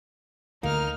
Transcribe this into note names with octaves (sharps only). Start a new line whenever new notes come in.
D2 A#3 D#4 F6